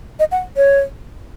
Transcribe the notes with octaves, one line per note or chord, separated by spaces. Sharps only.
D#5
F#5
C#5